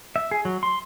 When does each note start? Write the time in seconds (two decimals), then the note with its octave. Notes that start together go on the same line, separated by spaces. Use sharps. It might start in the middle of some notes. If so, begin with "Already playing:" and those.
0.16 E5
0.31 G#4
0.45 F#3
0.63 C6